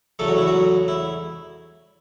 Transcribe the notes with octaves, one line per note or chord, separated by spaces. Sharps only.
E2 C#3 F#3 A3 C#4 A4
F#4
E4
F#3 F#4
E4